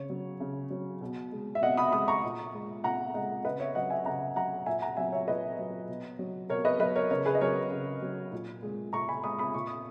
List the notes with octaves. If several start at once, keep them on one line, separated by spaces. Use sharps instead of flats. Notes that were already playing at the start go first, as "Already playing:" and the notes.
Already playing: C#3 C#5
F#3
C#3
F#3
B2
G#3
E5
B2 D#5 F#5
B5 D#6
G#3 B5 D#6
A#5 C#6
A#2
G#3
A#2 F#5 A#5
G#3 D#5 F#5
C#3 B4 D#5
C#5 E5
F#3 D#5 F#5
E5 G#5
C#3 F#5 A#5
F#3 F#5 A#5
A#2 E5 G#5
F#5 A#5
F#3 E5 G#5
C#5 E5
A#2 B4 D#5
F#3
B2
F#3
B2 A#4 C#5
B4 D#5
F#3 B4 D#5
A#4 C#5
C#3 A#4 C#5
G#4 B4
D#5
F#3 A#4 C#5
C#3
F#3
A#2
G#3
A#2 A#5 C#6
G#5 B5
G#3 B5 D#6
B5 D#6
A#2 C#6
D#6